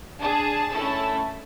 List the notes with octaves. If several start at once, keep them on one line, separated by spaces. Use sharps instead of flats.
D4 G#4 A5
A3 C#4 E4 A4